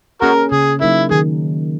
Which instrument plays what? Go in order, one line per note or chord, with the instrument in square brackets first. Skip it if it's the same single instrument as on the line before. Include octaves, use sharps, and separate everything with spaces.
[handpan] A#3 C#4 G#4 [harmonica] F#4 A#4
[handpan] C#3 [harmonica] G#4
[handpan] F#3 A#3 D#4 A#4 [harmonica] E4
[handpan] D#3 [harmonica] G#4